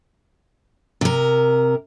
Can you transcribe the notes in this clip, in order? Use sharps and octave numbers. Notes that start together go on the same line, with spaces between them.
C3 A#4